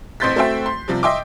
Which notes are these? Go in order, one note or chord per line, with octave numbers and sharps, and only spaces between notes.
A1 C4 C6 G6 A6 B6
A3 C4 F#4 C5 E5 G5
C6
C3 F3 G3
D#5 E5 G5 C6 D6